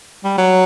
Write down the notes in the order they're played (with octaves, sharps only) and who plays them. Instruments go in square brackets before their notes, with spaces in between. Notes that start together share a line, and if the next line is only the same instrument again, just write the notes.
[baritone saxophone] G3
F#3